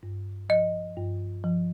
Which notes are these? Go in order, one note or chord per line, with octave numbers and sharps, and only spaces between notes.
G2
F3 D#5
G2
F3